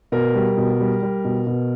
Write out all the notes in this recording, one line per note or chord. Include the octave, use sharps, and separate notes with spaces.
B2 A#4
G3
B2
G3
G3
B2
B2